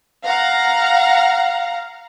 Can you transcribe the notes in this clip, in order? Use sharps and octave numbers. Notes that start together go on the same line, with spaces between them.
F5 F#5 A#5